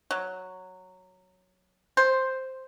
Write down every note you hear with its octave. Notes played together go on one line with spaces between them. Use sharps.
F#3
C5